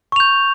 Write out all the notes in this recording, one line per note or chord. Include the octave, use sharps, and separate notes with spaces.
C#6 G6 F7